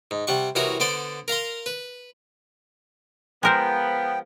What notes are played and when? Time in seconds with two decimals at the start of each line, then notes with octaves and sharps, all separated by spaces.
0.11 G#2
0.27 C3 G3 F#5 C#6
0.55 C2 E3 F#4 A#4 C#5 D#6
0.80 D3 B3 C5 D5 C6 D6
1.28 A#4 F5 A#5 C6
1.66 B4
3.43 F3 G#3 B3 A#4 C5 G5